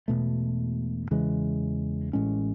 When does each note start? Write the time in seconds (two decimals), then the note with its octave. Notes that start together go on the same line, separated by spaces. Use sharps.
0.08 E1 E2 B2 A3
1.11 E2 C#3 E3 G#3
2.13 A1 A2 G#3 C#4